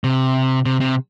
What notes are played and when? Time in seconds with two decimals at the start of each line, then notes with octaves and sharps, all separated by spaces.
0.04 C3
0.65 C3
0.80 C3